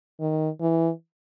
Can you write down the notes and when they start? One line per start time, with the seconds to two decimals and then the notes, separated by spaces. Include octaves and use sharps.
0.20 D#3
0.61 E3